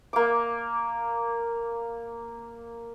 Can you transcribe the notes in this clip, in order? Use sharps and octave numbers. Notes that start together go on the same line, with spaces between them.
A#3 D6